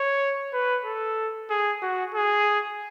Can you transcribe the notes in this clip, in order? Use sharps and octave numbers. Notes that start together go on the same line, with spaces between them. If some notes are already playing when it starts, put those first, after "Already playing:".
Already playing: C#5
B4
A4
G#4
F#4
G#4